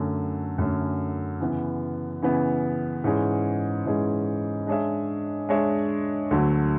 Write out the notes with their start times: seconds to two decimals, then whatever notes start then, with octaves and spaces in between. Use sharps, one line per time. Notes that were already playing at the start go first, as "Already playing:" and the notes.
Already playing: F#2 D3 A3 C#4
0.58 F#2 D3 A3 C#4
1.40 C#3 E3 B3
2.22 C#3 E3 B3
3.04 G#2 E3 G#3 C#4 G#4
3.86 G#2 E3 G#3 C#4 G#4
4.67 G#3 D4 G#4 C#5 E5
5.49 G#3 D4 G#4 C#5 E5
6.31 D2 D3 F#3 A3